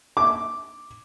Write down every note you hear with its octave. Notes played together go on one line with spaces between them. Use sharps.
D6